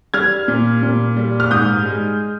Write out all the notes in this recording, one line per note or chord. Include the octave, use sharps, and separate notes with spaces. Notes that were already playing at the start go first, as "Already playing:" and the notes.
G3 F6 G#6
A#2
A#2
G3
F6
G#2 D#6 G6
G#3